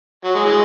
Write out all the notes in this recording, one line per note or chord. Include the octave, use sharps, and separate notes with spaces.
F#3
G#3
E3 G#3